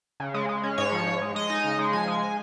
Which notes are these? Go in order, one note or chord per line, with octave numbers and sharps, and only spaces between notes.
C#3
G#3
G#3
C#4
G#2 C#5
F3
G#2
G#3
G#3 D#5
D#4
C#3
G#3
F3 G#5
G#3